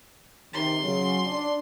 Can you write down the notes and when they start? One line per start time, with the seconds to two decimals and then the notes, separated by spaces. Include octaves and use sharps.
0.54 C3 D#3 C6
0.83 C#3 F#3
1.25 D4